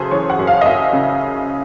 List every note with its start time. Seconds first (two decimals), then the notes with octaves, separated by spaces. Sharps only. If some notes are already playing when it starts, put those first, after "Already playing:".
Already playing: F#2 C#3 G#4 A4 C5
0.11 E3 C#5
0.30 F#5
0.39 F#2
0.47 F5
0.61 D#5
0.66 F#2 E5
0.93 C#3